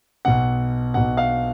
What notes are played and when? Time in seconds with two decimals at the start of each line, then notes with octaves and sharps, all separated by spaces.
0.25 B1 B2 F#5
0.94 B2 F#5
0.97 B1
1.17 F5